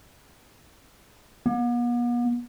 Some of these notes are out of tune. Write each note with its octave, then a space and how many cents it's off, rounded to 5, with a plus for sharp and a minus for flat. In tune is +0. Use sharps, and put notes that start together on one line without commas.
B3 -45